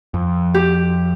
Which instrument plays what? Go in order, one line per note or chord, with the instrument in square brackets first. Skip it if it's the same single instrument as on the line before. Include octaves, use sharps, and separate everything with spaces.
[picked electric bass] F2
[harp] G4